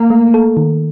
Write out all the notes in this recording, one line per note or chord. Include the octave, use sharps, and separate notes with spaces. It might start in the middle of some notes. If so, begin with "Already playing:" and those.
Already playing: A#3
A3
A4
D#3